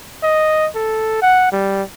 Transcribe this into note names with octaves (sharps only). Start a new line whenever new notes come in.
D#5
A4
F#5
G3